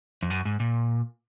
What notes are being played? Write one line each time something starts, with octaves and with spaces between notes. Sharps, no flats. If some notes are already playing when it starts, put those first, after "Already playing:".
F2
F#2
G#2
A#2